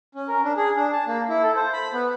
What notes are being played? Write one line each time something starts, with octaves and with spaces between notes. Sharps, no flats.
C#4
A#4
D4
G#4
D4
A5
A#3
E4
A4
C5
B5
B3